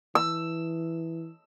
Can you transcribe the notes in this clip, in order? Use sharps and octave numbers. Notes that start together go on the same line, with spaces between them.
E3 E6